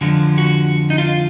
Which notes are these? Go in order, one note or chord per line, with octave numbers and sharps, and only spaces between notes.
F2 D3 F3 G#3
F#4
D#4
F4